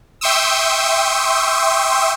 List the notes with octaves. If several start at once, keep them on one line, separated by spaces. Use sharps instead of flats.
E5 G5 C6 C#6 D#6 E6